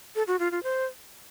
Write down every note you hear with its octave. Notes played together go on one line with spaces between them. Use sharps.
A4
F#4
F4
F4
C5